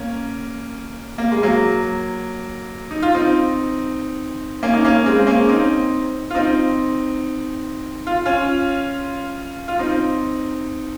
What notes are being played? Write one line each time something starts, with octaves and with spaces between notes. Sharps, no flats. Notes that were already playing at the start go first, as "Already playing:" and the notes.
Already playing: A#3 C#4
A#3
G#3
F#3 A#3
D#4
F4
C4 D#4
A#3 C#4
D#4
A#3 C#4
G#3 C4
A#3 C#4
C4 D#4
F4
C4 D#4
F4
C#4 F4
F4
C4 D#4